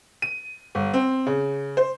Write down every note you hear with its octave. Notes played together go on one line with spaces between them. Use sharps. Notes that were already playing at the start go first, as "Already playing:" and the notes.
D#7
G1
C4
C#3
C5